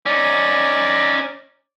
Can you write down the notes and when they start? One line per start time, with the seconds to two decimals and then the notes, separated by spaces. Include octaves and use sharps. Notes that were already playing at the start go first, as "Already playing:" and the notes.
0.06 C#4 D#4 D5